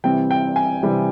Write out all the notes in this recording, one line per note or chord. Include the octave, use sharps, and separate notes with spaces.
C3 E3 G3 C4 G5
G5
G#5
C3 E3 G3 C4